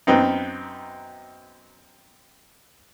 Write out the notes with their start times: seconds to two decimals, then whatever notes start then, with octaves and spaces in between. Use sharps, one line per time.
0.07 F#2 B3 C4 D#4